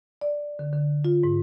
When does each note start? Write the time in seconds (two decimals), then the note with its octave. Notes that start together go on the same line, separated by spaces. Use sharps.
0.21 D5
0.59 D3
0.73 D3
1.05 F4
1.24 G#2